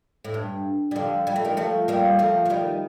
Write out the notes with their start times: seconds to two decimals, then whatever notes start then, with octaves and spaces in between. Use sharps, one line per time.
0.25 A2
0.34 G2
0.91 G3
0.96 D3 F3
1.27 G3
1.36 A3
1.45 D#3 G3
1.57 F3 A3
1.88 G3 A#3
2.19 F3 A3
2.46 F3
2.50 D#3 G3